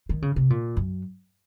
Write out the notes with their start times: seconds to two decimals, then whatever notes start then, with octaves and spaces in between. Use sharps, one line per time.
0.09 D#3
0.22 C#3
0.36 C3
0.50 A#2
0.77 F#2